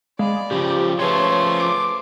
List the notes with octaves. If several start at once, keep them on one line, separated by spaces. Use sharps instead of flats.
G#3 D5 F5 B5
C#3 F3 G4
F3 A3 C#4 F4 G#4 B4 C#5 C6
D6